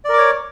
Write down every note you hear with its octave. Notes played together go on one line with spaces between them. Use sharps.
A#4 C#5 D5 D6